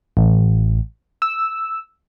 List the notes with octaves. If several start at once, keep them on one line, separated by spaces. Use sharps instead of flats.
A1
E6